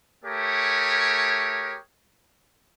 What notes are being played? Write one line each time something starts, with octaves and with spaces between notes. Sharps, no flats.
A3 G4 G#4 A#4 C#5